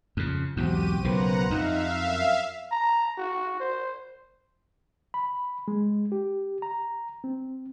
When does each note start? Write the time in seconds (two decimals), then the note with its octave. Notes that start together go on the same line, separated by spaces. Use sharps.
0.17 F2 C#3
0.57 B1 E2 G#2 C4 F#4 G4 D#7
1.04 B1 C#3 A#3 B4 C5 F#5 A#5
1.50 F2 D#4 E5 F5
2.00 F#2
2.71 A#5
3.18 F#4
3.60 C5
5.14 B5
5.68 G#3
6.12 G4
6.62 A#5
7.24 C4